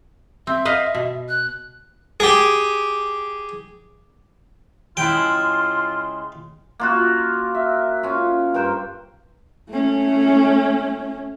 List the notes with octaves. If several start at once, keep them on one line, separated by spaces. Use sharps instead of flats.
C4 E5
B4 D#5 F5
B2
F#6
G4 G#4
C#3 G#3 E4 F4 G5 C6
A#3 F4 F#4
E5
C#4 F4
G2 A#4 C5 G5
A3 C#4